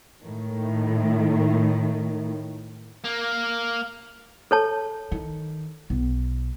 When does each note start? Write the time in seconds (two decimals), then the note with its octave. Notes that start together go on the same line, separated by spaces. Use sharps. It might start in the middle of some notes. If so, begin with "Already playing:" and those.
0.24 A2 D#3
3.04 A#3
4.51 A4 C#5 A5
5.11 D#3
5.90 B1